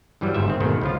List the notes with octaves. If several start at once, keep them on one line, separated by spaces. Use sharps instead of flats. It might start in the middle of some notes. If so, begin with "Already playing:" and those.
G2 E3 F#3 G3
G1 G#2 E5
D#3 C4
G#2 B2 D#3 G#3 A3
C#2 F3 F4